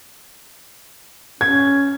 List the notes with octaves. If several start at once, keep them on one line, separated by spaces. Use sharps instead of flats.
C#4 G#6